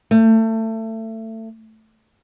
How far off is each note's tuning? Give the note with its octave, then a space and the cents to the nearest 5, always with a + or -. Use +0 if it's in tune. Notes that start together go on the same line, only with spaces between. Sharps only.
A3 +25